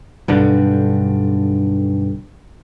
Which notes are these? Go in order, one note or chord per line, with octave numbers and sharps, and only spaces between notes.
B1 G2 D3